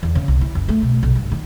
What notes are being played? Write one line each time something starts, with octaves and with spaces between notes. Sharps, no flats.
E2
C#3
C2
E4
F#1
A3
B2
B1
G2
D#3